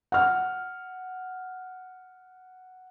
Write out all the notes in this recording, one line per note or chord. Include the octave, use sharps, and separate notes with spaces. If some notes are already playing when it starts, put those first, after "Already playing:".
F#5 F6